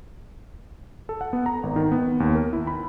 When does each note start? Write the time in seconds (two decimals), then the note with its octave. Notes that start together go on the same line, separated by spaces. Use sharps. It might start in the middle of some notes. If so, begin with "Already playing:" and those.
1.09 A4
1.21 F#5
1.33 B3
1.46 A#5
1.63 G#1
1.76 D#3
1.92 B3
2.20 D#2
2.35 A#4
2.53 E4
2.67 B5